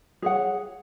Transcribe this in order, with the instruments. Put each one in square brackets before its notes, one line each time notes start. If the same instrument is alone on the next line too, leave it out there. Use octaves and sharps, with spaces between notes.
[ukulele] G#4 C#5 F#5